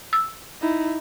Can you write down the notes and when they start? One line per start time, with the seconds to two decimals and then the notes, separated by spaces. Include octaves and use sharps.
0.13 E6
0.61 D#4 E4